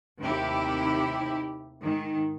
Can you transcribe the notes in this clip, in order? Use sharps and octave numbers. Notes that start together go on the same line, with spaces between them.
D#2 C3 A3 D#4 E4 G4
G#2 D#3